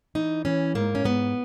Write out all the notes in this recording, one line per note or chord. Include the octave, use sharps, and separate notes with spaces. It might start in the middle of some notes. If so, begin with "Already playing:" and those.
E3 D#4
E3 C#4
G#2 A#3
C#4
G#2 B3